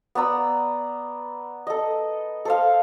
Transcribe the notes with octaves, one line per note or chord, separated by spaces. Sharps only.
B3 D5 A#5 E6
A4 D#5
A4 C5 F5